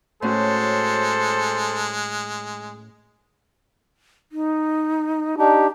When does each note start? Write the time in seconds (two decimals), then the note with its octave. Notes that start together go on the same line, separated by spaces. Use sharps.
0.22 A2 G#3 C#4 F#4 A4 C5
4.32 D#4
5.38 D4 D#4 G4